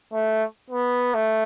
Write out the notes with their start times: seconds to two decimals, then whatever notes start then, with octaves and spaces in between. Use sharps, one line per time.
0.13 A3
0.70 B3
1.14 A3